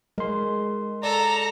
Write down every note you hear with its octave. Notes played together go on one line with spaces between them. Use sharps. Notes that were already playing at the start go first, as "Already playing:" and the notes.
G#3 A#4 C6
A4 D5 A#5